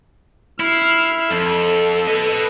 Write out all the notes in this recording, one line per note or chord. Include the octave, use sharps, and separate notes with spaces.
E4 F6 C7
F2 A4
B4 D#5